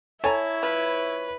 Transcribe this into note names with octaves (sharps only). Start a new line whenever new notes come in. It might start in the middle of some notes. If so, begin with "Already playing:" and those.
E4 A4 C#5 G#5 A#5
F3 B4